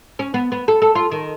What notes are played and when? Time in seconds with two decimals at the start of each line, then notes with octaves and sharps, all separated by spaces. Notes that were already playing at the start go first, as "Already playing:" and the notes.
0.19 C#4
0.34 B3
0.52 B3
0.68 A4
0.82 A4
0.95 F4
1.11 D#3